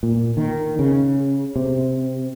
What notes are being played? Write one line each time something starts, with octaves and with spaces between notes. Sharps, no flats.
A#2
D#3
C#3
C3